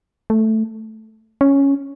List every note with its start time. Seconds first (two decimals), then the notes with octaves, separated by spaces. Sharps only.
0.30 A3
1.41 C#4